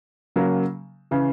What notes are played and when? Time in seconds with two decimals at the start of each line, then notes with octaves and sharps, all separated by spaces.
0.36 C#3 F#3 A#3
1.11 C#3 E3